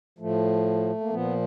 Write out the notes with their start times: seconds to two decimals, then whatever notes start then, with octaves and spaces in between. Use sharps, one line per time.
0.18 A2 F3 A3
1.01 A#3
1.10 A#2 F3 B3